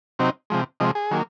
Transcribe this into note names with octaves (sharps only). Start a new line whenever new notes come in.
C3 F#3 C4 D#4
C3 F3 G#3
C3 F3 G#3 D#5
G#4
D#3 F#3 A#3